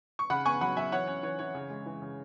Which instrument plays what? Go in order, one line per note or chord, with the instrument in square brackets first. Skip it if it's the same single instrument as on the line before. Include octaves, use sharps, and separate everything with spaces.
[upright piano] C#6
C#3 F#5 B5
B3 G#5 C#6
F#3 F#5 B5
F#3 E5 G#5
E3 C#5 F#5
C#4 C#5
E3 C#5
E3 C#5
C#3
G#3
E3
C#3